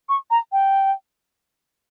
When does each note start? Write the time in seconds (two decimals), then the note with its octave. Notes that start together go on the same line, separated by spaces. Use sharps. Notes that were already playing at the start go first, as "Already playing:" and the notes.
0.09 C#6
0.31 A#5
0.52 G5